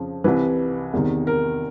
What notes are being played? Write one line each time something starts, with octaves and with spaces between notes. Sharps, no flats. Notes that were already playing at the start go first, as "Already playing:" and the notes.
Already playing: F2 C#3 F3
C2 C3 E3 B4
E2 C3 D#3
A#4